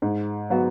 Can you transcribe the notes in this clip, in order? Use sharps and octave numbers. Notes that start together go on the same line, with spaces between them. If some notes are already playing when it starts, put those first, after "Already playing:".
G#2
F#3 B3 F#4